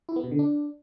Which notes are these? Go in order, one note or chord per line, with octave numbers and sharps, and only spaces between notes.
E4
B3
B2
D3
D4